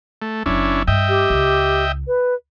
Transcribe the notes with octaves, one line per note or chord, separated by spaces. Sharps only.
A3
F#1 F#3 C#4 D4 E4
G2 D#5 E5 G5
G4
C#2
B4